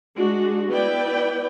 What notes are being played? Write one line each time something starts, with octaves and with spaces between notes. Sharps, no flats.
G#3 D4 F#4
B3 E4 B4 D5 G5